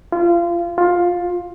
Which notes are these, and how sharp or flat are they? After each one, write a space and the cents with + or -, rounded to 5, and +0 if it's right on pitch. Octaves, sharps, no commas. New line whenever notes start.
F4 -25
F4 +15